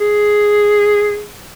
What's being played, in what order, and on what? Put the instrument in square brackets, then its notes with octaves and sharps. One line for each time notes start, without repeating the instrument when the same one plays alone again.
[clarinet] G#4